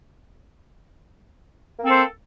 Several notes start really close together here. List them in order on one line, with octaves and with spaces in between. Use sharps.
A#3 C4 A4 C5